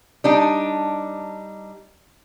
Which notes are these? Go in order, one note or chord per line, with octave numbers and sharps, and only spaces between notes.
G3 D4 D#4